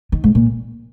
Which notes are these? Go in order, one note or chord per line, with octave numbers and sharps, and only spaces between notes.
D#3
G#2
A#2